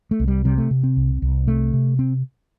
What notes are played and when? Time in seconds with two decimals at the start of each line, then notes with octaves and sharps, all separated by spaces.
0.11 A3
0.20 C2
0.28 G3
0.45 C3 G3
0.58 A3
0.71 C3
0.83 C4
0.97 C2
1.22 C2
1.48 C3 A3
1.73 C3
1.99 C4